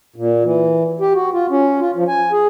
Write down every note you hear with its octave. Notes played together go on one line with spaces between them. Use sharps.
A#2
E3
G4
F#4
F4
C#4
F4
F3
G#5
G#4